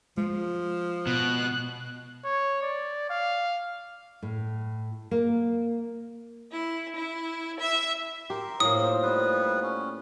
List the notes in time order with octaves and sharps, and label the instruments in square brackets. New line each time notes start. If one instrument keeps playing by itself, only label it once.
[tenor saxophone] F3 [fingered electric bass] G#3
[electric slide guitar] B2 [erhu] F#6
[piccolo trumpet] C#5
D5
F5
[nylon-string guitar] A2
A#3
[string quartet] E4
E4
E5
[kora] G4 [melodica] A#4 C6
[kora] A2 A#3 [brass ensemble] D#4 F4 C5 [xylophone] D#6
[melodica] G3 B3 B4
C#4